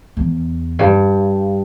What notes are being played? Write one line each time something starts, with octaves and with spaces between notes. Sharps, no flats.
E2
G2